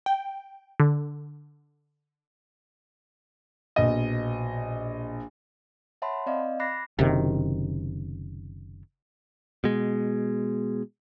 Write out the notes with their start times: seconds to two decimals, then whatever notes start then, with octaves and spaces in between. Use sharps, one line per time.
0.06 G5
0.80 D3
3.76 A#1 B2 D#5
6.02 C#5 E5 F#5 A5 B5 C6
6.26 C4 D5 D#5 F5
6.60 B5 D6 F#6 A6 A#6 C7
6.99 F#1 C3 D#3
9.64 B2 G#3